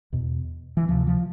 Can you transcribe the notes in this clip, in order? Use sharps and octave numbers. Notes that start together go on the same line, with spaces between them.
E2 B2
E3
D2 C3 F3
F3